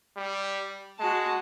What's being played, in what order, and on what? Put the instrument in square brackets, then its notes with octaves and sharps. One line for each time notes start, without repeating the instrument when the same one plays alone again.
[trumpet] G3
[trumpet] G#3 [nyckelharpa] F#4 A5